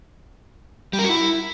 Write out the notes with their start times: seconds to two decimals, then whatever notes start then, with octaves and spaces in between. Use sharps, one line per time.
0.93 G3
0.99 A#4
1.04 F#4
1.09 E4